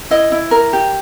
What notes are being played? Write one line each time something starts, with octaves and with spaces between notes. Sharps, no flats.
E4 D#5
E4
A#4
G4